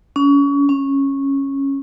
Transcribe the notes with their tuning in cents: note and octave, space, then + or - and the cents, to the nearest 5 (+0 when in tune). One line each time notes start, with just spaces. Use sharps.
C#4 +30
C#4 -10